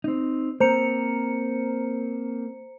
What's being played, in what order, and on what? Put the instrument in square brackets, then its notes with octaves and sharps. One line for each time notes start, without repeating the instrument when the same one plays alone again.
[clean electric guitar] C4 D#4
[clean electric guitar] A#3 C4 [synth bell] C5 A#5 C#7